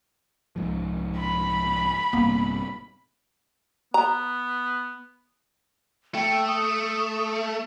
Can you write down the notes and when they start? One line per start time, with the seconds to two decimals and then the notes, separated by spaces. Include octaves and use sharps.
0.56 C2 G#2 F3
1.18 B5
2.13 A#1 G2 C3 A#3 B3
3.94 B3 A#5
6.14 A3 G5
6.47 D#6